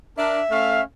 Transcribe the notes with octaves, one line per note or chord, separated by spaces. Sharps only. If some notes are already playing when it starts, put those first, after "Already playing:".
D4 A#4 E5
A3 C#4 F5